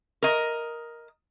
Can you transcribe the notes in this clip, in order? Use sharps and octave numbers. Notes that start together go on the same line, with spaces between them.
A#4 D#5